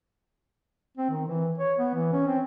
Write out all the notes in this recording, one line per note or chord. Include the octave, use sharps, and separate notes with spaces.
C4
D#3
E3
C#5
B3
E3
C#4
C4